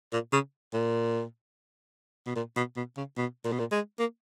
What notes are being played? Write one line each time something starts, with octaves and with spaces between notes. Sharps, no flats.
A#2
C#3
A#2
B2
A#2
B2
B2
C#3
B2
A#2
B2
A#2
G#3
A#3